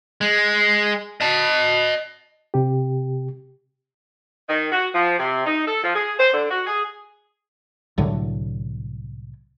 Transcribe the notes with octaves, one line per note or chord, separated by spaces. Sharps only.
G#3
D#5 A5
C3 G4
D#3
F#4
F3
C3
D#4
A4
F3
G#4
C5
D3
F#4
G#4
C2 A2 D3 F#3